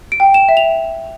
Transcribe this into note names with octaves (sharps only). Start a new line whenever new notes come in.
D7
G5
E7
E5
F7